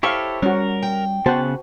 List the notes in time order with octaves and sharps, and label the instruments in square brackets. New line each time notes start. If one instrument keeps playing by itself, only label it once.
[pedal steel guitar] E4 G4 A4 [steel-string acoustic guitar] C5 C#5 [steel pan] F5 C#6
[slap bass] G3 [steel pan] C#4 F#4 [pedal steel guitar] A#4
[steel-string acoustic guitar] G5
[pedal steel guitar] C#3 F#6 [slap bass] B3 [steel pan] F#4 C5 A5